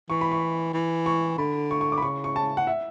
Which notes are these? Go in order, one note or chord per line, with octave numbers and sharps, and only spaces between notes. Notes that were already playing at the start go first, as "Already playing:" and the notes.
E3 C#6
B5
C#6
E3
C#6
D3 B5
C#6
C#6
D6
B5
C#3 C#6
C#6
A5
F#5
E5